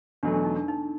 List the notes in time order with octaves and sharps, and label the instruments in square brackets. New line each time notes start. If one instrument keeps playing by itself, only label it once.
[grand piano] E2 B2 F#3 A3 [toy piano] D4
[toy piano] D4
D#4
D4
D#4